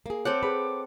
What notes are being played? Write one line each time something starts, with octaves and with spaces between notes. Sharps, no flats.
A#3 G#4
C4 A4 C#5 F#5 D6
G#4 B4 B5